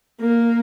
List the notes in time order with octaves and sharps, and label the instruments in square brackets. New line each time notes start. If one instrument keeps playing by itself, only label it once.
[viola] A#3